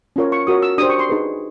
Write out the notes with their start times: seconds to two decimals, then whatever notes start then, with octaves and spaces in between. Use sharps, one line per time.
0.16 C#4 F4 A#4 C#5
0.32 C#6
0.47 F#4 A#4 C#5 D#6
0.62 E6
0.78 D4 G4 C5 D#6
0.90 C#6
0.99 C6
1.09 D#4 G#4 B4